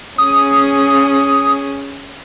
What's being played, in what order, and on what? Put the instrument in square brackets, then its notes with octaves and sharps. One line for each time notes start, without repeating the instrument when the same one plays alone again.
[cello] C#4 G#4 [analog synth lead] D#6